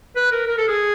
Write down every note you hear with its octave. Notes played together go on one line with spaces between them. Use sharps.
B4
A#4
A#4
A4
G#4